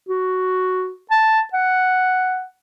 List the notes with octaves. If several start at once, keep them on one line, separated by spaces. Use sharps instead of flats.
F#4
A5
F#5